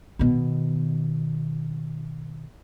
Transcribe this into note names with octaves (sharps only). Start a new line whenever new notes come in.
B2 D#3